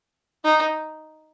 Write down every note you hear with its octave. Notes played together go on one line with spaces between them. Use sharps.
D#4